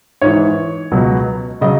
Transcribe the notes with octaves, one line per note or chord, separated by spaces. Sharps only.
G#2 E3 C#5
C#2 B2 F#3
C#3 F#3 D#5